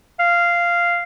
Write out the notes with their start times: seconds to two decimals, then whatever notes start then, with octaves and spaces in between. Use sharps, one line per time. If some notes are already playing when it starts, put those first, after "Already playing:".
0.19 F5